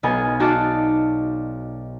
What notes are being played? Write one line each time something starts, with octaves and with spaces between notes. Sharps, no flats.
B1 B3 F4 D#5 G#5
D#4 F#4 D5 F5 A5